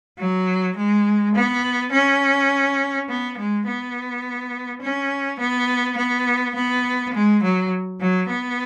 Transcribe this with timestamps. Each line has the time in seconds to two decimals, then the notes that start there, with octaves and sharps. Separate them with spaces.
0.18 F#3
0.76 G#3
1.35 B3
1.92 C#4
3.09 B3
3.37 G#3
3.67 B3
4.82 C#4
5.39 B3
5.97 B3
6.55 B3
7.13 G#3
7.42 F#3
8.00 F#3
8.29 B3